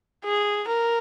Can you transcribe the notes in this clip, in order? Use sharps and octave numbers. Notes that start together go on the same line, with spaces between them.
G#4
A#4